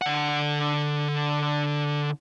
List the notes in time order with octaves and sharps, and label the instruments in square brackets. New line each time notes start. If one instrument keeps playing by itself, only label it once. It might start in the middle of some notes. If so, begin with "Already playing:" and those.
[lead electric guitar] D3 F#5